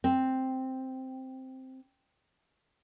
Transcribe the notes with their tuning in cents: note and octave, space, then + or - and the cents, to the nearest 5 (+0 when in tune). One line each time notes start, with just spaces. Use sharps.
C4 +0